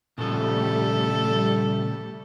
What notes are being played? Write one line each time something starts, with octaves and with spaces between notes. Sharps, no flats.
A#2 C#3 F3 G3 A3 A4